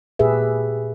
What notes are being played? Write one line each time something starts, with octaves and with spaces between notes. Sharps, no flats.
A#2 G4 G#4 B4 E5